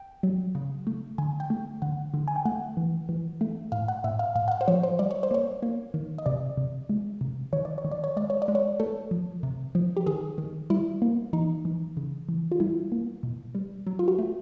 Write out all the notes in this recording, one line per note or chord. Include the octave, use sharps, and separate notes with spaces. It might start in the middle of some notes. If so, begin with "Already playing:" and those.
Already playing: G5
F#3
C#3
A3
D3 G#5
G5
A3
D3 F#5
D3
G#5
G5
A3 F#5
E3
E3
A3
A2 F5
F#5
A2 E5
F5
A2 F5
F#5
F5
C5
F3 C#5
C5
G3 D5
C#5
C5
A#3 C#5
A#3
D#3
D#5
C3 D5
C3
G#3
C3
D#3 C#5
D5
C#5
D#3
D5
C#5
G#3 D5
C#5
D5
G#3
C#5
A3 A4
F3
C3
F3
G4
D#3 G#4
D#3
G3 E4
A#3
E3 D#4
E3
C#3
E3
F4
G3 E4
A#3
B2
G3
F#3
F4
F#4
A3